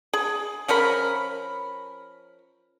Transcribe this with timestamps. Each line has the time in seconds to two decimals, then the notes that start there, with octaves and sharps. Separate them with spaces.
0.13 G#4
0.68 F3 C#4 A#4 B5